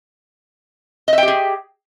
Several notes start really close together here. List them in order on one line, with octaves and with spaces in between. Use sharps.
D#5 E5 G5 G4 G#4